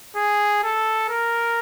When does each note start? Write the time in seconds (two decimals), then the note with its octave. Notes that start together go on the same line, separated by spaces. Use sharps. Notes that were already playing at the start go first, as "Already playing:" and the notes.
0.16 G#4
0.64 A4
1.09 A#4